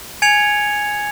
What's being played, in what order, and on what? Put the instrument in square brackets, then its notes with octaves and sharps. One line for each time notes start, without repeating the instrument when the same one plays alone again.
[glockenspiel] G#5 G#6 C#7 F7